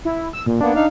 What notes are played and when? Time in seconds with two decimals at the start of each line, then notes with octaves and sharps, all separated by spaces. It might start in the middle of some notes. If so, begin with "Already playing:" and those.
0.05 E4
0.33 E6
0.46 A#2
0.61 A#3 B3 D4
0.75 D#4 F5